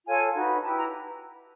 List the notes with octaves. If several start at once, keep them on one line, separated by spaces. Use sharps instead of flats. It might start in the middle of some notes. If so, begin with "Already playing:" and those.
F4 A4 C#5 G#5
D#4 F#4 B4
E4 G4 B4 A5
A#5